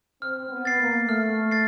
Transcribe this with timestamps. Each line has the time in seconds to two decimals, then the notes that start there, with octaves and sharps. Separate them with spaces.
0.22 C4 F6
0.51 B3
0.65 A6 C7
0.80 A#3
1.08 A3 F6
1.51 A6 C7